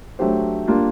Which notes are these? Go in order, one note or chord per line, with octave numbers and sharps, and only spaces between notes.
F#3 A3 D4 G4 C5
G3 A#3 D4 F4